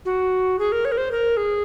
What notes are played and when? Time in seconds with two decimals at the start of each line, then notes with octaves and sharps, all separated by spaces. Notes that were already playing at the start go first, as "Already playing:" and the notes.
0.05 F#4
0.59 G#4
0.72 A#4
0.85 C#5
0.92 A#4
0.97 C5
1.11 A#4
1.37 G#4